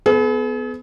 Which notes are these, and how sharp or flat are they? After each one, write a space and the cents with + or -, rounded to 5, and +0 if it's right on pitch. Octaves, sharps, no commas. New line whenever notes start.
B3 +15 G#4 +45